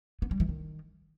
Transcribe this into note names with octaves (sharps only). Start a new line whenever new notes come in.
B3
G3
E3
D#3